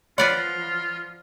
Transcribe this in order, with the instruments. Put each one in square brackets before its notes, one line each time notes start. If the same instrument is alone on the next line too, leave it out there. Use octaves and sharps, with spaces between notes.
[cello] F3 [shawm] F4 [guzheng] B4 D5 F#5 [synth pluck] C#5 B5